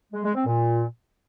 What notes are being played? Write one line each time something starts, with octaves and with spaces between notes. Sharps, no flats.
G#3
G#3
C4
A#2